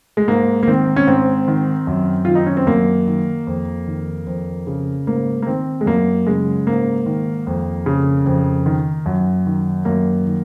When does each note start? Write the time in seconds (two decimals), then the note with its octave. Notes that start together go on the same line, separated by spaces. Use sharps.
0.17 G#3
0.28 G#2 A#3
0.63 A#3
0.68 D#3 C4
0.96 C#4
1.07 G#2 C4
1.48 D#3
1.87 F#2
2.25 D#3 F4
2.35 D#4
2.46 C#4
2.57 C4
2.67 F#2 A#3
3.07 D#3
3.47 F2
3.87 D#3
4.27 F2
4.67 C#3
5.07 G#2 A#3
5.42 A#3
5.46 D#3 C4
5.81 G#3
5.86 F#2 A#3
6.26 C#3 G#3
6.67 G#2 A#3
7.06 D#3
7.47 F2
7.86 C#3
8.26 F2
8.66 D#3
9.06 F#2
9.46 D#3
9.85 F#2 A#3
10.26 D#3